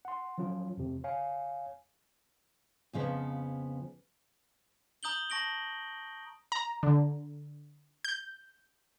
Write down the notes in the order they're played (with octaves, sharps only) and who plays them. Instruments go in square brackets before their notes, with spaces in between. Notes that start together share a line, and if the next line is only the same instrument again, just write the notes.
[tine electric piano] F#5 C6
F3 F#3 C#4 F4
F2 C3
C#5 F5 G#5
[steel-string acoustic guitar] F2 C#3 F3 B3
[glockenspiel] A#5 D#6 G6 F#7 G7
A5 C#6 A#6 D7 F#7 G7
[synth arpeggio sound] A#5
D3
G6